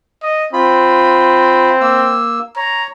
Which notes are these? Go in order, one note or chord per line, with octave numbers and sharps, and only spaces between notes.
D#5
C4 F4 B5
A#3 E6
C#5 A#5